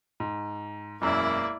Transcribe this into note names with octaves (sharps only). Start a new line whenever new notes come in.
G#2
E1 F#2 A#3 E4 D5